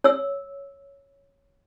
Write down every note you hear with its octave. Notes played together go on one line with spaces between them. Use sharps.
C#5 E6